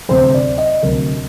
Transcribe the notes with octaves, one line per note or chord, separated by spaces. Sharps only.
D2 C3 F#3 C5
D5
D#5
D2 C3 F#3 A#4